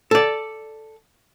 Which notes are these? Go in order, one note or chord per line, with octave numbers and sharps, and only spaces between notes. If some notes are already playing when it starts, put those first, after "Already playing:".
A4 D5